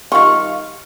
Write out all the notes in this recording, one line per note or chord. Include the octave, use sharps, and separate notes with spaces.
D#3 G3 F4 F5 C#6